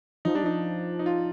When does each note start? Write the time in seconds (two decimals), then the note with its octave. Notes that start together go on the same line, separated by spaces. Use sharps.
0.25 F3 D#4
0.35 G3 D4
0.43 F3 D#4
0.99 D#4
1.06 F4